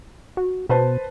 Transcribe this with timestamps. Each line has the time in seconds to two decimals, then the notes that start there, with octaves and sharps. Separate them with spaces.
0.37 F#4
0.69 B2 B4 C5 A5